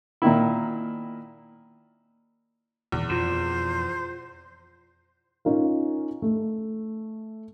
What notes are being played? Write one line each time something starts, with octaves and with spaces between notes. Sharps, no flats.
A#2 D#3 E4
D#1 E2
F2 B2 F4 C5 E7
C#4 D#4 F4 A#4
A3